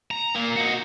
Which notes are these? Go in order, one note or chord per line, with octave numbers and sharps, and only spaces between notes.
A#5
A#2 A#3
D#4 F#4